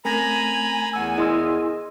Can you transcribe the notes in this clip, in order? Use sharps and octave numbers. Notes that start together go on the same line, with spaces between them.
A3 C4 C#4 A#4 G#5 A#5 B5 A#6
E2 F#5 E6
E4 G#4 A#4 D#5 C6 E6